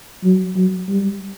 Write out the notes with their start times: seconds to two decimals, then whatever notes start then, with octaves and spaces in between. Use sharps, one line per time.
0.24 F#3
0.56 F#3
0.88 G3